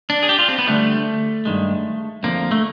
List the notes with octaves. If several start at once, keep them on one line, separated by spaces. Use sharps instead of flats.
D4
G#4
G4
F4
C4
B3
D2 D3 G3 A3
G2 D#3 G#3
F2 D3 F3 A#3
A3